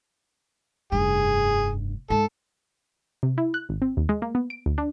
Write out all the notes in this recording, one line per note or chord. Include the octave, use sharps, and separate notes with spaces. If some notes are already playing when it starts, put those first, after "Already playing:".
F1 G2 G#4
G#2 A4
C3
E4
F#6
G#1
C4
D#2
G#3
A#3
B3
D7
D2
D4